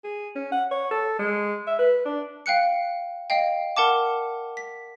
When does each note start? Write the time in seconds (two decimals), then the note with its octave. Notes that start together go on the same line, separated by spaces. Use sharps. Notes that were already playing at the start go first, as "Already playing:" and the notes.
0.04 G#4
0.35 C#4
0.52 F#5
0.71 C#5
0.91 A4
1.19 G#3
1.67 E5
1.79 B4
2.05 D4
2.46 F5 G5 F#6 C#7
3.30 D#5 F5 G5
3.76 A#4 F#5 A5 D6
4.57 B6